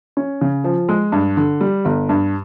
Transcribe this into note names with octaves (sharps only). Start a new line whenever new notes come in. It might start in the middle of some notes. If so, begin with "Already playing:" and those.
C#4
C#3
F3
G#3
G2
D3
G3
G1
G2